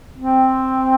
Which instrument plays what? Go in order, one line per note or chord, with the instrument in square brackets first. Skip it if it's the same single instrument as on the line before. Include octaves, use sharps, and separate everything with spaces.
[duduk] C4